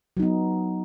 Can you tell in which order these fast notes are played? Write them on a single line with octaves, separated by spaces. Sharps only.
F#3 D#4 B3